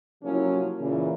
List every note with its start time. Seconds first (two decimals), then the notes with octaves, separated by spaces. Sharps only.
0.23 C3 F3 F#3 A#3 C#4 E4
0.81 A#2 C#3 E3